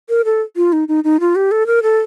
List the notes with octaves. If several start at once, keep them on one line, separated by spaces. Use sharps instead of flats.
A#4
A4
F4
D#4
D#4
D#4
F4
G4
A4
A#4
A4